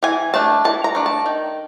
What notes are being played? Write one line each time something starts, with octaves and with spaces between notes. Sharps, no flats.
E3 G#5
A3 D4 A5
E3 A5
A#5
A3 D4
A5
D#3